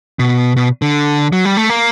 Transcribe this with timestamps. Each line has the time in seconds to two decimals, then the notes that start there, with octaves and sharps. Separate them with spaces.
0.19 B2
0.56 B2
0.82 D3
1.33 F#3
1.45 G3
1.57 A3
1.70 A#3